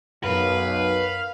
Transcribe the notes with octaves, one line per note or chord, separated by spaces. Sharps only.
B1 F#2 A#4 B4 F5